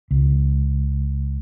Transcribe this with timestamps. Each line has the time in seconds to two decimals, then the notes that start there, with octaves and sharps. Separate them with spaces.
0.11 C#2